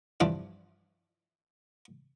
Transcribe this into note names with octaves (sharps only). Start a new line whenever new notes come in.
G2 E3 F3 C4 D4